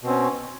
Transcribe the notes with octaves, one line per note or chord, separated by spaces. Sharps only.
B2 C4 C#4